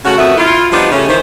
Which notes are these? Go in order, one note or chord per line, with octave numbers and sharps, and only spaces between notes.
C#3 A3 C#4 F#4
F2 D#3 A3 B3 F#4 E5
E4 F4
F3 G3 B3 D4 D#4
C#3 G3 A3 C#4
D#3 E3 C5